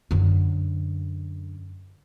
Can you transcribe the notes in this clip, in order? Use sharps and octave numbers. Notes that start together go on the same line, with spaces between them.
F#2 D3